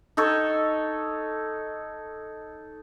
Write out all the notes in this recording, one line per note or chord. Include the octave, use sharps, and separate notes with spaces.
D#4 A4 C#5